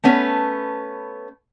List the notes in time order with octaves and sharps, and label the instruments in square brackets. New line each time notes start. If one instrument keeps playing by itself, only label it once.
[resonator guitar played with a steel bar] A3 B3 C#4 B4